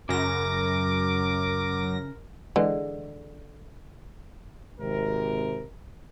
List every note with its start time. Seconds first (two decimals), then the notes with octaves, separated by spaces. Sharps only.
0.09 F#2 C#3 A#4 D6 A#6
2.56 D3 E3 G#3
4.79 G#1 C3 A#4